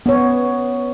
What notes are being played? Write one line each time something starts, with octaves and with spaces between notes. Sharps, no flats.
B3 C#5